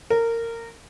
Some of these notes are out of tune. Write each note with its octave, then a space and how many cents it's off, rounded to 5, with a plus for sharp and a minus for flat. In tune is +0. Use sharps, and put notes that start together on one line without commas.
A#4 -20